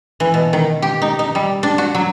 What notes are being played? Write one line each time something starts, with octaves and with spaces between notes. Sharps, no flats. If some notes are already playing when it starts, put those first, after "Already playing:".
E3
B2
D#3
G4
D#4
D#4
G3
D4
F#4
F#3